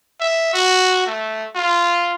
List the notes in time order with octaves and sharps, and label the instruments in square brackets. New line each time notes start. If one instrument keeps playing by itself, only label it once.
[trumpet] E5
F#4
A3
F4